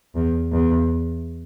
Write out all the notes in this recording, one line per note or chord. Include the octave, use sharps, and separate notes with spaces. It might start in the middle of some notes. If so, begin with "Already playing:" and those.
E2
E2